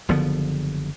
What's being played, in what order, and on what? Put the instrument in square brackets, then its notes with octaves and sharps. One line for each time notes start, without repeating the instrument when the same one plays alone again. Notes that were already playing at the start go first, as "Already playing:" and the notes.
[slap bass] F#1 D3 F3 B3